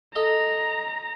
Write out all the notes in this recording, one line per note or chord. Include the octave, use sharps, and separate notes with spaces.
A4 D#5 A#5